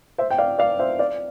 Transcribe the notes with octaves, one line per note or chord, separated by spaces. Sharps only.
C5 E5
G5
D5 F5
D5 F5
C5 E5
D5 F5